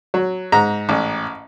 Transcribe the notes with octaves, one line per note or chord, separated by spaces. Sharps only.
F#3
G#2 A#5
A1